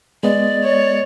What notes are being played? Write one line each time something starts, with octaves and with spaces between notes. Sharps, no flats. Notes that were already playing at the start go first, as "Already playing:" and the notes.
G#3 B3 D5 D#5
C#5